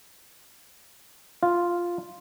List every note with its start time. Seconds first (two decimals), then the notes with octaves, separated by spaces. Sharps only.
1.43 F4